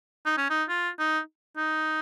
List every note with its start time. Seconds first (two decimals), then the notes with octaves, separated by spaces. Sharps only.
0.26 D#4
0.37 C#4
0.50 D#4
0.69 F4
0.99 D#4
1.57 D#4